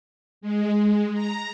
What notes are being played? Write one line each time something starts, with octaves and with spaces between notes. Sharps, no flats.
G#3
A#5